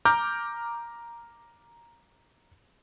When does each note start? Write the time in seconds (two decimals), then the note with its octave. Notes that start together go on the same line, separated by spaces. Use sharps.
0.05 A#5 D6 F6 G6